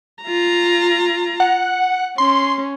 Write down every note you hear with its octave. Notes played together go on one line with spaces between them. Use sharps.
F4 A#5
F#5
C#4 C6